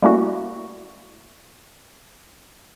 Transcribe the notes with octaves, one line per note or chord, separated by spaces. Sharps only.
G3 A3 A#3 C#4 E4 F#4